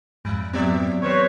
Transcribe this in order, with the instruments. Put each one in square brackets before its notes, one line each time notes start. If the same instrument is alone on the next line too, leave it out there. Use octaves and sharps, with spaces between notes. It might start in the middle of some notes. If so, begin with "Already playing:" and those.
[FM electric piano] F2 G#2 [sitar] F#3
[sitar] F3 G4 D5 [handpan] F#3 B3 C4 [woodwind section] E5
[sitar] D#2 C4 [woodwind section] B4 C#5